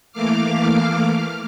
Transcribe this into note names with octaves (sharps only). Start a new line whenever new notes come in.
E3 A3 A#3 F5 D6 F6